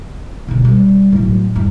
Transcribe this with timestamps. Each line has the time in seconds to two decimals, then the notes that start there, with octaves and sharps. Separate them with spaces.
0.48 B2 D3
0.65 G3
1.12 A2 F#3
1.55 E2 G2